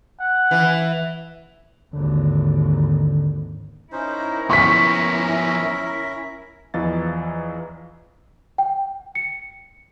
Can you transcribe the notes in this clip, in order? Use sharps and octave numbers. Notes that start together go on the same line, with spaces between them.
F#5
E3
G#1 D#2 D3
C#4 D#4 E4 A#4 C5
F3 B3 C#4 E5 C#6 B6
E2 E3 F3 D#5 F5 A6
G5
C#7